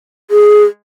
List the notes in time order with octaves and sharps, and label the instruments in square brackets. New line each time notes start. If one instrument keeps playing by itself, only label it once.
[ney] G#4